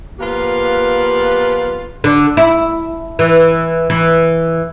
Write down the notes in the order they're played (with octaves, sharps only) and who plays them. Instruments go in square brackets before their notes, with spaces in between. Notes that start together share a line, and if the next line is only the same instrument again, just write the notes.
[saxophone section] F3 A#3 B3 F4 G4 B4
[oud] D3
E4
E3
E3